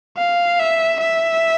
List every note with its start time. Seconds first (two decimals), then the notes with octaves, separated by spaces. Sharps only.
0.17 F5
0.59 E5
1.01 E5